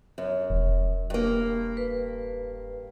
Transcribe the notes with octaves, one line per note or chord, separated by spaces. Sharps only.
F#2
E1
G2 A#3
B4